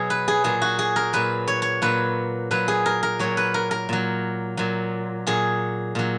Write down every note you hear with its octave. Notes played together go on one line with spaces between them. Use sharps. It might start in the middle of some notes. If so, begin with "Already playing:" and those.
Already playing: B2 F#3 G#4
B4
G#4
A#2 F#3 G#4
F#4
G#4
A#4
A#2 F#3 B4
C#5
C#5
A#2 F#3 B4
A#2 F#3 B4
G#4
A#4
A#4
A#2 F#3 C#5
B4
A#4
A#4
A#2 F#3
A#2 F#3
A#2 F#3 G#4
A#2 F#3